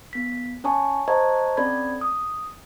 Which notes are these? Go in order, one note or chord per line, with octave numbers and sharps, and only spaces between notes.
B3 B6
C#4 C#5 G#5 A5 C#6
C5 D#5 A5 A#5 C#6 G#6
C4 C#4 A4 D5 B5 G#6
D#6